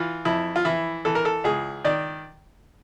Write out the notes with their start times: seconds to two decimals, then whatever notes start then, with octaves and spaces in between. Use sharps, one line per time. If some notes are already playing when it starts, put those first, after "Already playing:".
Already playing: E3 F4
0.25 F2 E4
0.56 F4
0.65 E3 E4
1.05 E3 A4
1.15 A#4
1.25 A4
1.44 C#2 G#4
1.85 D#3 D5